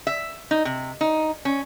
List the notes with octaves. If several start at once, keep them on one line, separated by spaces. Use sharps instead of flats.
E5
D#4
C3
D#4
C#4